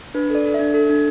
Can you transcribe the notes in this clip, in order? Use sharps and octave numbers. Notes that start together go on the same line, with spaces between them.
D4 B4
A4 D5
A4
D4 E5
A4
D4